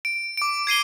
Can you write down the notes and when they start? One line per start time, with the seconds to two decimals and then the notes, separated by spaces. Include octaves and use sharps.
0.05 D7
0.37 D6 D7
0.67 G#6 C7 D#7 G7